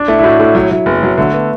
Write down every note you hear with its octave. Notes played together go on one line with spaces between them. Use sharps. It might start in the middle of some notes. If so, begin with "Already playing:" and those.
Already playing: D4
A3 E4
E4
A2 F#4
A2 A4
F#3 E4
F#3 E4
F#1 B3
F#3
D3 A3
B3